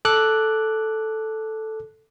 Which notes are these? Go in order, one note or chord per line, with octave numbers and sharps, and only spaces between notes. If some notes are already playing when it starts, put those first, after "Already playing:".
A4 D6 F#6